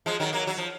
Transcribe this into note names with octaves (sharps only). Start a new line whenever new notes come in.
F3 G#3
D#3 F#3
F#3 A#3
F#3
F3